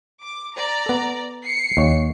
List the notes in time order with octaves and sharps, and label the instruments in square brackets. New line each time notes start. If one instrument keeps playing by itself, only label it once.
[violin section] D6
D5 A#5
[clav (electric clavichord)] B3 A4
[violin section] C7 C#7
[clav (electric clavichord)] D#2 C#5